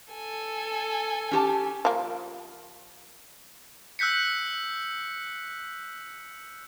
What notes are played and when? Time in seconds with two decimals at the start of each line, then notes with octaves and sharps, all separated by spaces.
0.13 A4 G#5
1.31 C#4 G4 A5
1.85 F3 A#3
3.99 E6 F#6 G6 B6 C#7